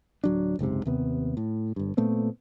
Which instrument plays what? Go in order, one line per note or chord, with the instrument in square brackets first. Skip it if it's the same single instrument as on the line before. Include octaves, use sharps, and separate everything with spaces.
[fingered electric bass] D1 F#3 D4
F#1 C#2 G#2 C3
D#2 C3 B3
A2
G1 G2
A#2 A3 B3 C4